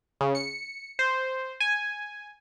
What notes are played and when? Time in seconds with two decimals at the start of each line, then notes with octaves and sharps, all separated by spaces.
0.21 C#3
0.35 C#7
0.99 C5
1.60 G#5